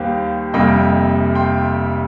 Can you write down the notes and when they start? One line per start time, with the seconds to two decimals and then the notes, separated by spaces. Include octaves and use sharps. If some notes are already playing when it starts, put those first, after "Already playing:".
Already playing: D#2 D#3 G3 A#3 C5 F5
0.54 F1 F2 C3 G3 A#3 D#5 G5
1.35 G5 C6